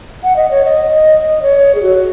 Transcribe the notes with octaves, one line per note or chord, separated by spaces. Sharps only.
F#5
D#5
C#5
D#5
C#5
G#4
F#4